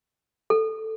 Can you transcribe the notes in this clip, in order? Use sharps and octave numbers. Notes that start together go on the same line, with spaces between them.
A4